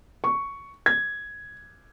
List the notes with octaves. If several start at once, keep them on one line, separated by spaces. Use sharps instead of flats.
C#6
G#6